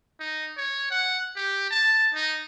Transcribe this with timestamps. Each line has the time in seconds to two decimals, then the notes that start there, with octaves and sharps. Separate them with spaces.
0.20 D#4
0.57 C#5
0.91 F#5
1.36 G4
1.70 A5
2.14 D#4